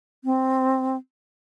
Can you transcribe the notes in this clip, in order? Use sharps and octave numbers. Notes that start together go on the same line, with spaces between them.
C4